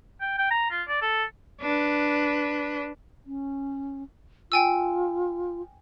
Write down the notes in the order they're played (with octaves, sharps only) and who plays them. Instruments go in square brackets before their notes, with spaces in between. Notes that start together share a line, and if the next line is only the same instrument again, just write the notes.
[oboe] G5
G5
A#5
F4
D5
A4
[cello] D4 B4
[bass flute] C#4
[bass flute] F4 [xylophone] G5 G#5 E6